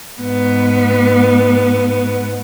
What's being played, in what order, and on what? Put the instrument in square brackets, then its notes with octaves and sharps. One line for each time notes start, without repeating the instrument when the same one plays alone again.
[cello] G#2 B3